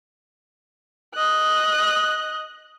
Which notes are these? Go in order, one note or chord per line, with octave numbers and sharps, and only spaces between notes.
D#5 F#6